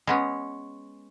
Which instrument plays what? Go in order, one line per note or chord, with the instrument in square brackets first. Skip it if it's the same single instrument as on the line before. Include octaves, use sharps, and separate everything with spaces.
[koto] G#3 B3 C#4